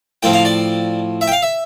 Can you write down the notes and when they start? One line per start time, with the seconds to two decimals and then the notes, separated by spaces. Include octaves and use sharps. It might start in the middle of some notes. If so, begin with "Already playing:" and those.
0.23 A2 F3 C4 G5
0.33 F5
0.45 D5
1.21 E5
1.28 G5
1.32 F5
1.42 E5